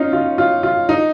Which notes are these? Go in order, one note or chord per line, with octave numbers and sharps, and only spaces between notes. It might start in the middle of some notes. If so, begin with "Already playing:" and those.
Already playing: C#4 D#4 F4
F4
F4
F4
D#4